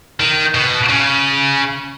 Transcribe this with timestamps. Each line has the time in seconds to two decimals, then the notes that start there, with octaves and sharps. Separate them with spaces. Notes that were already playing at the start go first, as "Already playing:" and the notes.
0.20 D#3
0.54 B2
0.89 C#3